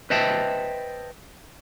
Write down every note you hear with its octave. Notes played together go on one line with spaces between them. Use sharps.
B4 C5 D#5 E5 G5 A5